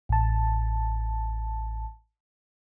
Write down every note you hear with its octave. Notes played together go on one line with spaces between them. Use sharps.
A1 A5